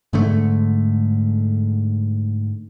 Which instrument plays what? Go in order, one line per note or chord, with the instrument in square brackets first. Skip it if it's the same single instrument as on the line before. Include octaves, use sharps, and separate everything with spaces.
[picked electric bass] G#2 D3 A3